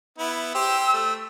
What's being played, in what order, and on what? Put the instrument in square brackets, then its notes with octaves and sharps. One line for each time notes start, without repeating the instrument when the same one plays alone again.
[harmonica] B3 E4
[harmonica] G4 C5 [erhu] E6
[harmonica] A3